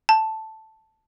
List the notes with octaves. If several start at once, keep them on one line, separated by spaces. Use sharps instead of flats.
A5